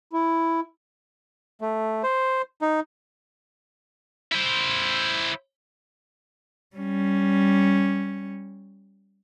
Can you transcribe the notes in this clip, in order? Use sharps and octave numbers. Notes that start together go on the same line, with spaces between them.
E4
A3
C5
D#4
E4 C5
G3 C#4